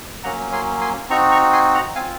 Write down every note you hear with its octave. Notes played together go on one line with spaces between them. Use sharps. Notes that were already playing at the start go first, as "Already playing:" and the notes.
F#3 A#3 C#4 F#5 A#5
G#5 C6
G#5 C6
C4 D#4 F#4 A#5 C#6
A#5 C#6
G#5 C6
F#5 A#5
C4 F4 F5 G#5